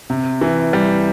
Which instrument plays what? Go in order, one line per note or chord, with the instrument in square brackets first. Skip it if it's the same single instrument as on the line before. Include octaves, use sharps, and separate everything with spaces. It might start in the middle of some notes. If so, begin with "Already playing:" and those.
[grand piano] C3
E3
G3